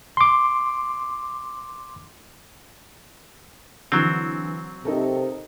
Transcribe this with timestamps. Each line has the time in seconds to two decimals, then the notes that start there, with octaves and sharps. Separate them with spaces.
0.17 C6 D6
3.92 D3 E3 F#3 C4
4.85 C3 D#4 A4 A#4